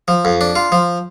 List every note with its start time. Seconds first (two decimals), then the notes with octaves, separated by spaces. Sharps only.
0.08 F3
0.25 F2
0.41 D4
0.56 F4
0.72 F3